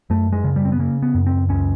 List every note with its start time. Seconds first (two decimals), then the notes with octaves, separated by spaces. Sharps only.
0.10 F#2 A3
0.33 G#3
0.44 C#3
0.56 G3
0.65 C4
0.72 B3
0.79 C#3 A#3
1.02 B3
1.14 F#2
1.26 C4
1.49 C#2 C#4